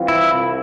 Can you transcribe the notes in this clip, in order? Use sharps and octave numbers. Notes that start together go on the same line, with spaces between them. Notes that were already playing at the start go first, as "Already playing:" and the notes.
Already playing: E3 G3 C4 F4
E4
C2 C3